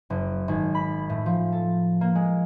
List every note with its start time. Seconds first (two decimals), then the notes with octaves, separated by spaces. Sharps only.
0.10 F#1
0.48 G#1
0.75 B5
1.09 A2
1.26 F3
1.52 A4
2.01 A#3
2.15 G#3